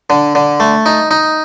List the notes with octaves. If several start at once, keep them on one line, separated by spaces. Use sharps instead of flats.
D3
D3
A3
D#4
D#4